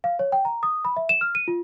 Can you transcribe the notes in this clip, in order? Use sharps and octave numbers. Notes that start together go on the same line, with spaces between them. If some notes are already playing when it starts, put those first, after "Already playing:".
F5
C#5
G5
A#5
D#6
B5
E5
E7
F6
D#7
F4